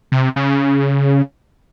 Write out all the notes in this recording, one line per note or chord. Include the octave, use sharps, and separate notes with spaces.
C3
C#3